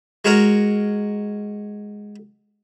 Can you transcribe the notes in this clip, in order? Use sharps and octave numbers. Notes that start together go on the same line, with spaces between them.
G#3 F#4 A#4 C#5